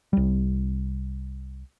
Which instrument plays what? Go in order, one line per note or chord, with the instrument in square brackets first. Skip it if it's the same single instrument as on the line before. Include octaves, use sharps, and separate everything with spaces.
[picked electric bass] C2 G3